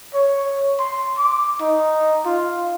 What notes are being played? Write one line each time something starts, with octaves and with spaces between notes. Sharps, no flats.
C#5
C6
D6
D#4
F4